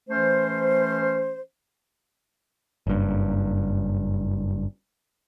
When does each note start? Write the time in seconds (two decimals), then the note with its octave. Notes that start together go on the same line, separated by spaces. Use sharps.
0.10 E3 A3 C#4 C5
2.87 F#1 G2